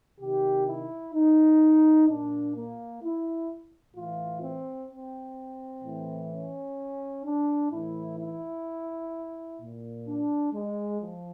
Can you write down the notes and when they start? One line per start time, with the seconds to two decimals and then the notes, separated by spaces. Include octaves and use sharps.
0.20 C3 D#3 G4
0.67 E4
1.13 D#4
2.08 A#2 D4
2.54 A#3
3.02 E4
3.95 A2 E3 F4
4.42 C4
4.89 C4
5.83 A2 E3
6.30 C#4
7.24 D4
7.71 A2 E3 E4
8.18 E4
9.59 A#2
10.06 D4
10.52 G#3
11.00 F3